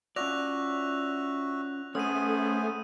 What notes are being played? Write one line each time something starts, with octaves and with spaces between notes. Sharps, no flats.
C#4 F4 F#4 D5 E5 F#6 A#6 F7
A3 B3 C#4 G#4 C5 D#6 D#7